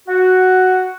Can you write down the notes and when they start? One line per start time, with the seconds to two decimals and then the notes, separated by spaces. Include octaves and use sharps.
0.08 F#4